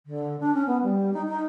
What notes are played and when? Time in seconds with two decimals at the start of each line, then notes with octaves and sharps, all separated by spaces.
0.06 D3
0.40 D4
0.54 C#4
0.67 B3
0.83 G3
1.13 D#4
1.28 D#4